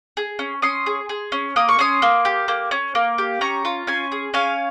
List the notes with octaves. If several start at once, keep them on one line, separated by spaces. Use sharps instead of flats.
G#4
C#4
C#4 C6 D#6
G#4
G#4
C#4
A#3 D#6
C#6
C#4 C6 D#6
A#3
G4
A#3
C#4
A#3
G4
C#4 A#5 C#6
F4
C#4 G#5 C6
G#4
C#4 F5 G#5